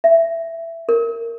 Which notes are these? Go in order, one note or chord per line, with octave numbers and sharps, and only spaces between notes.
E5
A#4